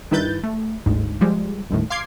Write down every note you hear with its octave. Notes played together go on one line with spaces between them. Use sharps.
G2 D#3 E4 B4 G6 A6
A3
G1 D2 G#2
F3 G3 G#3
G1 D#2 A2
F5 C6 D6 G#6 C7